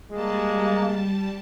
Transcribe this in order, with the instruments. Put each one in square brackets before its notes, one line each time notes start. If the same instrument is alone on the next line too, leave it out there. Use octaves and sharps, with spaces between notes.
[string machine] G3 A5 [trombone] G#3 [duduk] A#3